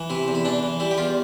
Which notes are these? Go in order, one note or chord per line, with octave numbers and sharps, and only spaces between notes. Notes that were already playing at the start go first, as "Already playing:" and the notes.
Already playing: E3
C3 E4
E2
E4
E3 D4
E3
G3 E4
G4
E2 F4